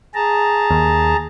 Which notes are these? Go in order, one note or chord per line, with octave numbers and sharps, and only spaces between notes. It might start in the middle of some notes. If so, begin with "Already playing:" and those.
G#4 A5 A#5
D#2